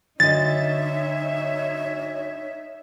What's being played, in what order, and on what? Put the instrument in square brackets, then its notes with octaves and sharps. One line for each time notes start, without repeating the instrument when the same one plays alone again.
[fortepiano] D2 D#5 [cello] D#4 E5 [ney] C#5 [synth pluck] A6